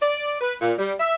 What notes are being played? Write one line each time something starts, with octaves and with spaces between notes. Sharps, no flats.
D5
B4
A#2
G3
E5